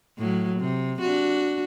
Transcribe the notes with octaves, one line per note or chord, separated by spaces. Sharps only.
A2 F#3
C3
D4 F#4